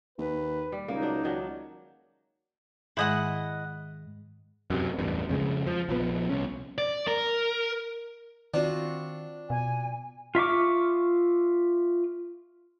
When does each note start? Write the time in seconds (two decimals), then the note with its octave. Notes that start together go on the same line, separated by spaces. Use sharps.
0.18 D#2 B4
0.72 G3
0.88 C#2 A#3 D#4
1.02 F#3 D4
1.23 D#3 F#3 D4
2.97 G#2 D#3 G#3 E4 D#5 F#5
4.70 F#2 C3
4.99 A1 E2 G2
5.29 F2 C#3 G#3
5.66 F3
5.89 A#1 F3 B3
6.29 C2 C#4
6.78 D5
7.08 A#4
8.54 D#3 C4 D4 F4 F#4
9.50 B2 G#5
10.35 F4 E5 C#6 D6